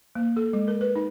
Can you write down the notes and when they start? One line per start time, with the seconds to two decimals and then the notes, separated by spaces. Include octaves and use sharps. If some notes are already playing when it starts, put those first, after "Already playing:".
0.15 A#3
0.37 A4
0.53 G#3
0.68 A#4
0.81 B4
0.95 D#4